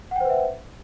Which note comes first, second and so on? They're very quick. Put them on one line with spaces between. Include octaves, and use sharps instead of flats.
F#5 G5 C5 B4 E5